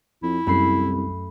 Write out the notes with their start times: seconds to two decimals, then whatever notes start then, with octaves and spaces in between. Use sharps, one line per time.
0.23 F2 E4
0.47 C2 F#2 A3 B5 C7